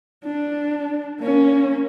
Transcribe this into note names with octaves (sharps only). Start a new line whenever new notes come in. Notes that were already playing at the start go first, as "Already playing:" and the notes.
D4
A#3 C#4